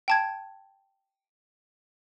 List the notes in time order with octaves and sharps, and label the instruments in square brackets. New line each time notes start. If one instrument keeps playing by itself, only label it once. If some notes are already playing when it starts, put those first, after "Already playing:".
[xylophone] G5 A5 G#6